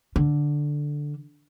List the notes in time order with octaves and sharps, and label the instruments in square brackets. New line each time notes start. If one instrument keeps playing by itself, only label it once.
[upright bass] D3